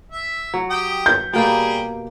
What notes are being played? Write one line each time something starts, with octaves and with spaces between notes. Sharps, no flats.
E5
F#3
G4 G5 D#6
G6
B2 G3 A#3 G4 G#4 G5